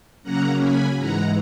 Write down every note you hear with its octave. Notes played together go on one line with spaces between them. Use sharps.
C#3 F#3 A#3 C#4 F#5 A#5
G#5 B5
G#2 E3 G#3 F#5 A#5